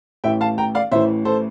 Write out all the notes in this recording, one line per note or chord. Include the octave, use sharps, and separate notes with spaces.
A1 A2 E3 E5 G5
F5 A5
G5 A#5
D5 F5
A1 A2 E3 C5 E5
A4 C5